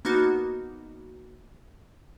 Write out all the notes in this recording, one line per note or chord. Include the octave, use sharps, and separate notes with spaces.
A#3 B3 D#4 F#4